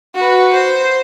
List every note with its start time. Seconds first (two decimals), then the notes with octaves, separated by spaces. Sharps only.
0.15 F#4 B4
0.53 C5